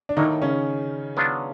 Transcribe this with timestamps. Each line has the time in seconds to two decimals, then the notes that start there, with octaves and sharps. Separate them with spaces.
0.09 D4
0.17 A2 D#3 F#3 A#3 D#4
0.42 C#3 C#4
1.17 F#3 B3 D4 F4